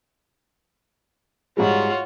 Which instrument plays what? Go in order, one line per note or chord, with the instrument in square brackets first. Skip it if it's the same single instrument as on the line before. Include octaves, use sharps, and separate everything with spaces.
[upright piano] G#2 G3 G#3 [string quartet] F4 F#4 C#5